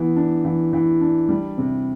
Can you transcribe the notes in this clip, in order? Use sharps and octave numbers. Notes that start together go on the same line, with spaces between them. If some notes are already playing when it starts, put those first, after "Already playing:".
Already playing: E3 B3
D4
E3
E3
D4
G3
C3